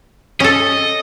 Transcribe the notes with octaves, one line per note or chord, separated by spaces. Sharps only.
C#4 A4 D#5